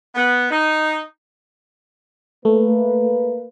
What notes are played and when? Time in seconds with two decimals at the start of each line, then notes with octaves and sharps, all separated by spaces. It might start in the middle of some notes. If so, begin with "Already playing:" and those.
0.15 B3
0.51 D#4
2.45 A3 A#3 B4